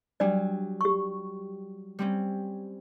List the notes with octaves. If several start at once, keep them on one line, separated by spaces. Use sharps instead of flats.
F#3 G3 D4 D5
G4 C#6
G3 C4 C#4